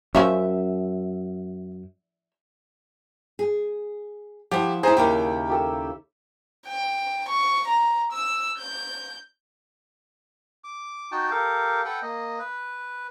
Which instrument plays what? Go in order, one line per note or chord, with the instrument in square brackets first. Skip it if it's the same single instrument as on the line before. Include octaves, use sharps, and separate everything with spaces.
[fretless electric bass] F#2 [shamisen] F3 C#4 C#5 [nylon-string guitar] E5
[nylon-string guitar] G#4
[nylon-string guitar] F3 E4 [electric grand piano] G4 [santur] F#5 A5
[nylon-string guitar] E4 G#5 [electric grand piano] G#4 C5 A#5
[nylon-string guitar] D#2 C#3 D#4 [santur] E4 G4 A#4 [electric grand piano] G5
[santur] G4 A4 E6
[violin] G5
C#6
A#5
E6
G6
[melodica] D6
D#4 F#4 G5 A5
G4 A4 A#4 F5
A4 B4 F#5 G5
A#3 D#5
B4